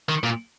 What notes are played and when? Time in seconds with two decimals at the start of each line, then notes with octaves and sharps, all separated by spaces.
0.09 D#3
0.24 A#2